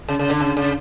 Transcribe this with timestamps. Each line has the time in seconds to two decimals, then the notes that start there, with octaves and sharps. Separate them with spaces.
0.08 C#3
0.19 C#3
0.30 D3
0.40 C#3
0.57 C#3